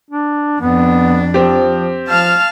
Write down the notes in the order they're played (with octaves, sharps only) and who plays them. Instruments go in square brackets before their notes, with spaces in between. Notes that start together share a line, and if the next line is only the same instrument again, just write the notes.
[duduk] D4
[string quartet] F2 D4 [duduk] B3
[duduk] F3 [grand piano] C4 G4
[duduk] F3 [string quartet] F5 A5 F6